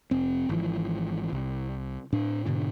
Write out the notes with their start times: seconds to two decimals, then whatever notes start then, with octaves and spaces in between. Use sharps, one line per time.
0.11 F1 C4
0.49 G#1 E3 F3
1.33 C2
2.12 A2 D4
2.46 G#2 B2 D3 D4